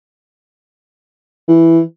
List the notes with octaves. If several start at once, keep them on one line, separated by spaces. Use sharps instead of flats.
E3